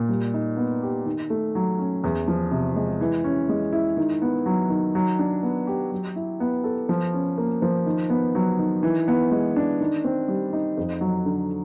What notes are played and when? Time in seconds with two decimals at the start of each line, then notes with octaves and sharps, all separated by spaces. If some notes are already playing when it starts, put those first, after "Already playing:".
Already playing: A#2
0.09 G3
0.34 D#4
0.57 B3
0.82 G4
1.05 D#3
1.30 A3
1.55 F#3
1.79 C#4
2.04 E2
2.28 F3
2.51 C3
2.76 G#3
3.01 E3
3.24 C#4
3.49 G#3
3.73 E4
3.97 D#3
4.22 B3
4.46 F#3
4.70 D#3
4.95 F#3
5.19 D4
5.43 B3
5.67 G4
5.92 F#3
6.16 E4
6.40 B3
6.64 A4
6.89 F3
7.13 C#4
7.38 A#3
7.62 F3
7.86 D#3
8.10 B3
8.35 F#3
8.59 D#3
8.83 E3
9.08 B3
9.31 G#3
9.56 D4
9.80 D#3
10.04 C4
10.28 G3
10.53 D#4
10.77 F2
11.01 F#3
11.26 D3